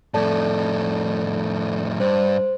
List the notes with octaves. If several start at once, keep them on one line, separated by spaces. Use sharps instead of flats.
F2 A2 A4 D5 A5
G2 C5